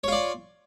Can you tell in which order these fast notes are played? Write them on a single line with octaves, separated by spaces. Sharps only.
C#5 F4 D5